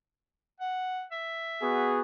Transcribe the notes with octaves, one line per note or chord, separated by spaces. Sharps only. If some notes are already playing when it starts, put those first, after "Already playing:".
F#5
E5
B3 F#4 G#4